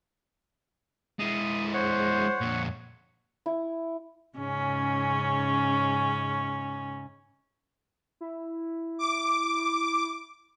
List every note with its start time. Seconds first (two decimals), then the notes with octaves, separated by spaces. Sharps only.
1.19 G#3 E4 D#6
1.74 C5 C#5 F#5
2.41 F2 A#2
3.46 E4
4.38 G#2 C#3 C#4
8.21 E4
8.99 D6